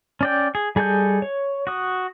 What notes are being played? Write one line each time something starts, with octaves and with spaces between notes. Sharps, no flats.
C#4 D5 G5
G#4
G3 G#4 A4 D#5 G6
C#5
F#4 D#6